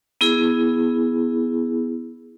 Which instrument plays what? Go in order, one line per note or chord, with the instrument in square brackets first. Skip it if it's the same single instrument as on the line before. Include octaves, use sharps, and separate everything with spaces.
[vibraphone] B3 E4 G#4